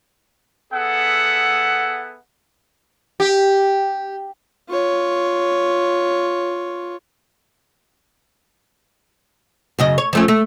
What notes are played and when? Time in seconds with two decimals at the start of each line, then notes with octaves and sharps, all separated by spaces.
0.73 B3 G#4 A4 E5 F#5
3.20 G4
4.69 F4 C#5
9.79 F#2 C#3 D#5
9.98 C#5
10.13 F3 A3 C#4
10.28 A3